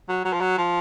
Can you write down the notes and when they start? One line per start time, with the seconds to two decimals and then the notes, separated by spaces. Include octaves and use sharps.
0.09 F#3
0.25 F#3
0.33 F3
0.41 F#3
0.58 F3